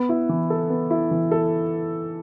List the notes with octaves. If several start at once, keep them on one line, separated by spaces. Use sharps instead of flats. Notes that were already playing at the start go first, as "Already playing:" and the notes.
Already playing: B3
E4
E3
A4
B3
E4
E3
A4